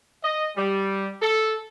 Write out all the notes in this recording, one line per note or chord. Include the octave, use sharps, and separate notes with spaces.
D#5
G3
A4